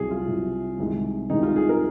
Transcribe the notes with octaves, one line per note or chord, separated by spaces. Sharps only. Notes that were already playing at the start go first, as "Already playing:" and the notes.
Already playing: C2 C3 F#3 G#4
F4
C2 C3 F#3
C2 C3 D#3 G#3
C2 C3 D#3 G#3 D#4
F4
G#4
A#4